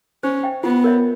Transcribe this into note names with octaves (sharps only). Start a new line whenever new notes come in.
C#4 C5
E5 G5
B3 F4
A#4 C#5 E5